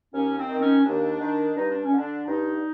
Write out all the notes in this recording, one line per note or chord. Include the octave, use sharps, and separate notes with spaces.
D#2 C#4
C4
D#3
C#4
D#2 D4
D#3
G2 D#4
D4
C#4
D3
D4
G2 D#4